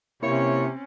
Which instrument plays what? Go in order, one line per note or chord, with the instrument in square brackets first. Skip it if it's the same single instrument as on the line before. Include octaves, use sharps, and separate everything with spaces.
[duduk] C3 [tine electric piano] A#3 E4 [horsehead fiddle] C4 C#4 [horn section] C#5